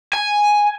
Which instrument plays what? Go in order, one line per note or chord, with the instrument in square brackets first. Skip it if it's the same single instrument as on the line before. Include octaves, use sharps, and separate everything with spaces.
[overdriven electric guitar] G#5